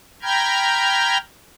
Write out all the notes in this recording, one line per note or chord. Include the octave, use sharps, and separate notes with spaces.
G5 A#5 B5 F6 G6 G#6